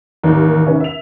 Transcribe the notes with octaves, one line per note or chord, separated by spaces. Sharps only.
A1 D#2 A#4
C3 D#3 B3 C#4
E5 F7